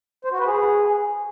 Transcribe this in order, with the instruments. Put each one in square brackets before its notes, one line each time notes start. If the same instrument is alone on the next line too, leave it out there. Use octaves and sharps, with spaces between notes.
[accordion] C5
F#4
B4
G#4